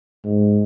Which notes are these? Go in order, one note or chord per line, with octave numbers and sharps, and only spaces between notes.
G#2